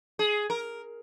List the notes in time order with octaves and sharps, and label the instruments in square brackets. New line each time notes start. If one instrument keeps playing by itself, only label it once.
[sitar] G#4
A#4